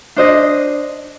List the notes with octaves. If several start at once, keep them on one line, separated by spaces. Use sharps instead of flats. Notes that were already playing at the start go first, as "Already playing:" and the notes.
D4 C5 D#5